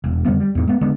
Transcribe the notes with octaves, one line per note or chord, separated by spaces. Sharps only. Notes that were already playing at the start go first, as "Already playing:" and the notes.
E1
F2 D3 G3 B3
G3
E2 G#2
G#3 A3 B3
D3 G#3 B3